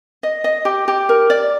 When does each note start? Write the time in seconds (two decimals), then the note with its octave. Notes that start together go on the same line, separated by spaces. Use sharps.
0.23 D#5
0.44 D#5
0.65 G4
0.88 G4
1.09 A#4
1.30 D5